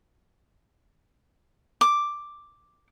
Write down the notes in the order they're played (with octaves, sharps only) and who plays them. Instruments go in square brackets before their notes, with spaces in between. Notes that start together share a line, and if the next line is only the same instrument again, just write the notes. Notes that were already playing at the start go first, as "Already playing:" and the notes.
[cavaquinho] D6